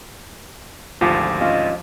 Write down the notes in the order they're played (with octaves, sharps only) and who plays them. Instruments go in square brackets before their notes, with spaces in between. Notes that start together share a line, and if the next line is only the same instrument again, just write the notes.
[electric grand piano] G#1 D2 [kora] F3 G4
[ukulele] C#4 F4 D#5